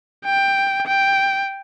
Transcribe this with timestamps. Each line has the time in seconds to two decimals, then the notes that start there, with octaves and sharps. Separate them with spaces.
0.25 G5
0.87 G5